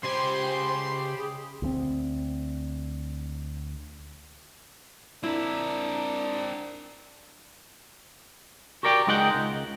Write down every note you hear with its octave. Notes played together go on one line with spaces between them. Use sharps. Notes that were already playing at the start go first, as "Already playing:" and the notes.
C#2 G4 C5 G#5 B5 C6
G#4
D2 G3 C4
C4 D4 E4 A#4
F#4 G4 A#4 D5 G5
C#2 G#3 D#4 A#4 F#5 G5
C#2